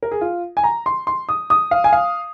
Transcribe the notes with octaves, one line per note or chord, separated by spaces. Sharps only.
A#4
G#4
F4
G#5
A#5
C6
C6
D#6
D#6
F5
G#5
F5